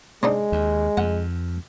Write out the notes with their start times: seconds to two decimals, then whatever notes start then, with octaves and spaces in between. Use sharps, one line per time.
0.23 G#3 C4 D4 D#4
0.52 D#2
0.97 F2 F#5